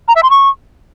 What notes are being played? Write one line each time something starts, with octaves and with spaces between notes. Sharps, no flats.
A#5
E5
C6
C#6